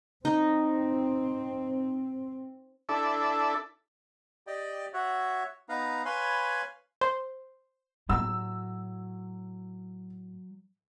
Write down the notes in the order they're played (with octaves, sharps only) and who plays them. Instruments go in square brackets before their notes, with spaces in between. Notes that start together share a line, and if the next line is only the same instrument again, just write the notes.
[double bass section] C4 [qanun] D#4
[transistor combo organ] D4 E4 A4
[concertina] G4 D5 D#5 G5
F#4 C#5 E5 F#5
B3 D#4 B4 F5 A#5
B4 C#5 F5 G#5 B5 C6
[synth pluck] C5
[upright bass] A2 [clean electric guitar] F#3 [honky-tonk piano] E6